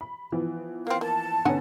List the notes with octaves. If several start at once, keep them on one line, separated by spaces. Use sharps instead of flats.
B5
E3 F3 B3
A#3 C4 F5
A#3 A5
D3 B3 C#4 D#4 F#5 G#5